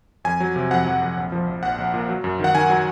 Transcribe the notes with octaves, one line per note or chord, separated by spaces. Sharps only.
F2 G#5
F#3
C3
F2 F#5
F2
F2
A#1
F3
A#1
A#1 F#5
A#1
A#2
F#3
F#2
D#3 F#5
D#3 G#5
F#3